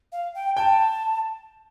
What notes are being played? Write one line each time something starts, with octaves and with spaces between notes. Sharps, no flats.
F5
G5
G5 A5